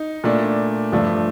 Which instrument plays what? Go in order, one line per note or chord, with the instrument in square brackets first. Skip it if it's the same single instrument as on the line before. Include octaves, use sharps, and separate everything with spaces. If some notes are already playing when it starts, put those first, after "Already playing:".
Already playing: [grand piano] D#4
A#2 A3 D4
G2 F3 A3 D4